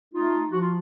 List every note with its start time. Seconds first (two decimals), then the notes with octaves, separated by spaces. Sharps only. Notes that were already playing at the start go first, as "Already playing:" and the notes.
0.13 A3 D#4 F4
0.51 F3 F#4
0.60 F4